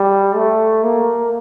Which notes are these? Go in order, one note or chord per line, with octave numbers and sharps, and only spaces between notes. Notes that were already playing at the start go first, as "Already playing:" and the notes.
Already playing: G3
A3
A#3